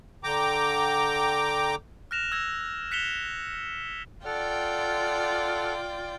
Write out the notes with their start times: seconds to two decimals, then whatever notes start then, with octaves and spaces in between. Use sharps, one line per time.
0.24 D3 G5 A#5 D6
2.11 F6 F#6 A#6 E7 F7
2.32 E6 G#6 A#6
2.91 F#6 B6 C#7 E7 F7 G7
4.25 F4 A4 D5 F#5 G5 F6